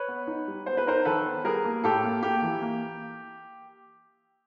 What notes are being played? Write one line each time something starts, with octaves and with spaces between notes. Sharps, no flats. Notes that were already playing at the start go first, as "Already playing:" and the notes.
Already playing: B4 C#5
B3
D#4
G3
B3 C5
B4
D#4 A#4 C5
D#3 A4 B4
B3
G3 G#4 A#4
A#3
A2 G4 A4
A#3
A#3 G4
E3
A#3